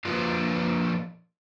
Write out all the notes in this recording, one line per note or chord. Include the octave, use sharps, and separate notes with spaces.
F3 A#3 D4 F4 A#4 B4